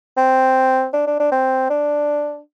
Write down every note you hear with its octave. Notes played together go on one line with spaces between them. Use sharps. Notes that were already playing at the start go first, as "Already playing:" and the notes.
C4
D4
D4
D4
C4
D4